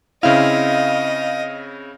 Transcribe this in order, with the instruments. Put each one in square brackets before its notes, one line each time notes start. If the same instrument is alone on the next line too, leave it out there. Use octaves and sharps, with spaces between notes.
[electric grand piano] C#3 C4 E4 [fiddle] D#5 [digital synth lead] F5